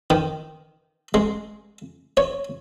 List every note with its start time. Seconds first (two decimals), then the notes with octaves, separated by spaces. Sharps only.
0.10 D#3
1.14 G#3
2.17 C#5